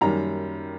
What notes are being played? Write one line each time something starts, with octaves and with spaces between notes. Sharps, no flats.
F#2 D#3 G3 A#3 A#5